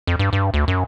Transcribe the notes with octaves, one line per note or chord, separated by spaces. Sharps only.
F2
G2
G2
D2
F#2